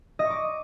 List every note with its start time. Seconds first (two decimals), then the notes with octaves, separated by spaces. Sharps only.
0.19 D#5
0.25 C#6
0.30 D6